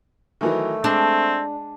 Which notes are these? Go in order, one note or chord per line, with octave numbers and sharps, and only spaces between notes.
D#3 E3 F#3 A3
G#3 C4 D4